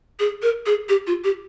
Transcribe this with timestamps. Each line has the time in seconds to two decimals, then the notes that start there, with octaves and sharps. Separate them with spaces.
0.20 G#4
0.43 A#4
0.66 G#4
0.89 G4
1.07 F4
1.24 G4